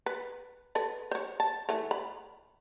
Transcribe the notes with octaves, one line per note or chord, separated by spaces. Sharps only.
B4
A4 B4 B5
C5 C#5
A5
E3 A3
B5